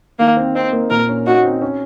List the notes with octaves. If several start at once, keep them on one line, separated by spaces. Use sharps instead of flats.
D#3 A#3
C4
C4 D#4
A#3
A#2 A#4
C#4
D#4 F#4
C4
C#4